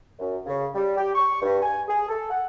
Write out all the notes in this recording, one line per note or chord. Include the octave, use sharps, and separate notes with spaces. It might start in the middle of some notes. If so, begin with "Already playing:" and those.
F#2
C#3
G3
G4
C#6
G2
G#5
G#4
A4
F#5